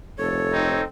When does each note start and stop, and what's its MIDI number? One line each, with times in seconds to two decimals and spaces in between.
0.18 0.78 29
0.18 0.84 69
0.18 0.81 73
0.52 0.82 60
0.52 0.82 63